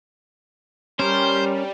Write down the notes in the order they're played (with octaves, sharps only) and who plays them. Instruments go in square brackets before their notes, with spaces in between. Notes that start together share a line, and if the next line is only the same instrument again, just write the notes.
[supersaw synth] G3 [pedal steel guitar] C#4 A#4 [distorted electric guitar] C5